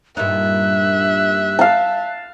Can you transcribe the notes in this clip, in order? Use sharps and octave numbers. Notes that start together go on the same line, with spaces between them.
G2 A#2 D#4 E5 F#6
F5 A5